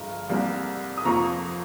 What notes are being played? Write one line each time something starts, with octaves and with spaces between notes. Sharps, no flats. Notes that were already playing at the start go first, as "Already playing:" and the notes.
Already playing: G1 G2 F3 G#3 A#5
C2 C3 G3 A#3
D#6
F2 C3 F3 A#3 A#5 C#6